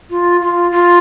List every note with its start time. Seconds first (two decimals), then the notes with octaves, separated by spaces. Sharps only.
0.10 F4
0.41 F4
0.72 F4